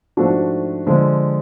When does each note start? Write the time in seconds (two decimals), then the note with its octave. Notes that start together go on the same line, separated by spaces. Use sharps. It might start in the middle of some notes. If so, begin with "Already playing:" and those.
0.17 G#2 F3 A3 D4 F#4
0.87 D3 F3 G#3